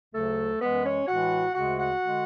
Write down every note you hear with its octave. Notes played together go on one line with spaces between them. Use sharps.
D2 C#3 F#3 A3 A4
F#2 E3 G#3 B3 B4
C#4 C#5
A2 E3 G#3 F#4 F#5
D2 C#3 G#3 F#4 F#5
F#4 F#5
D3 G#3